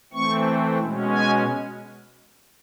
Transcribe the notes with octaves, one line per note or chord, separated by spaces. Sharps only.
E3 A3 C4 C#6
B2 G#3 C#4
G#5